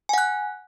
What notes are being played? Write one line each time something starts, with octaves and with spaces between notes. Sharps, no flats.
F#5 G#5 F#6